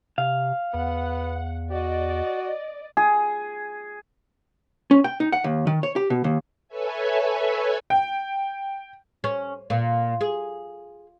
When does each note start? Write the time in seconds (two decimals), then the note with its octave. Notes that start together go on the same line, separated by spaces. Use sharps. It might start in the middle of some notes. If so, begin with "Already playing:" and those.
0.18 C3 F5
0.74 E2 B3 F#5
1.71 F#4 D5 D#5
2.97 G#4
4.91 C#4
5.04 G5
5.20 D#4
5.32 F#5
5.44 D#2
5.67 D#3
5.83 C#5
5.96 G4
6.10 B2
6.24 D#2
6.68 A4 B4 C#5 E5 G#5
7.90 G5
9.24 C#4
9.70 A#2
10.21 G#4